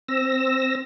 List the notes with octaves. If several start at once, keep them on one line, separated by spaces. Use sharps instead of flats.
C4 E6 A#6